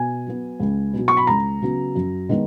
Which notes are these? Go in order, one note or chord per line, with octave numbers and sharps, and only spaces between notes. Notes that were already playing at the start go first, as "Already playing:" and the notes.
Already playing: B2 G#5
F#3 B3
C#2
B2 F#3
C#6
B5
C#2 A#5
C#3 F#3 B3
F#2
D#3 G#3 B3